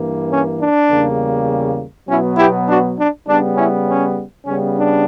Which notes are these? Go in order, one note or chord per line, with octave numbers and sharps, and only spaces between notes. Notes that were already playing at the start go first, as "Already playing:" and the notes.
Already playing: G2 E3 A#3
C#4
D4
E2 C#3 G3 A#3
B2 F#3 B3 C#4 E4
E4 G4
D4 F#4
D4
C#3 G3 B3 D4
C#4 E4
C#4
C#3 G3 B3 C#4
D4